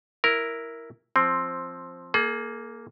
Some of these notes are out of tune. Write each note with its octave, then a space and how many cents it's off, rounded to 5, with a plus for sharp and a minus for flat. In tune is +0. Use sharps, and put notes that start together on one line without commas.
E4 +0 A#4 +0
F3 +0 C4 +10
A#3 +0 G#4 +40